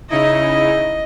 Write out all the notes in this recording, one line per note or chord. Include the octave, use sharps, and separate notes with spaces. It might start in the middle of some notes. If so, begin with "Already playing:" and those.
C#3 D#4 E4 D#5